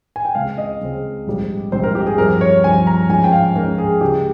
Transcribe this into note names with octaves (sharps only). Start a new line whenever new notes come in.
G#5
G5
C#2 C#3 G#3 C4 F5
D#5
C#2 C#3 G#3 C4
A#1 G#2 G3 C4
A#1 G#2 G3 C4 C5
A#4
G4
G#4
G2 F3 C4 A#4
C#5
G2 F3 C4 G#5
A#5
G#2 F3 G#3 C#4 G#5
G5
F5
G#2 F3 G#3 C#4 A#4
G#4
C#2 C#3 G#3 G4